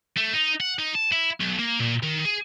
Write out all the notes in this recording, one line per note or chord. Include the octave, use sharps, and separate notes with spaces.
A3
D#4
F#5
D#4
A5
E4
B1
A#3
A#2
D#3
G#4